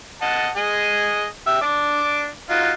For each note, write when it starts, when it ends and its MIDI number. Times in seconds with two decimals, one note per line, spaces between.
0.22 0.49 75
0.22 0.49 78
0.22 0.49 81
0.56 1.25 68
0.56 1.25 75
1.47 1.57 67
1.47 1.57 76
1.61 2.28 62
1.61 2.28 86
2.50 2.72 63
2.50 2.72 65
2.50 2.72 66